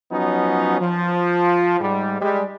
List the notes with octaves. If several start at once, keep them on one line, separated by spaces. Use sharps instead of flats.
F3 F#3 B3 C#4 D#4
F3
G#2 G3
G3 G#3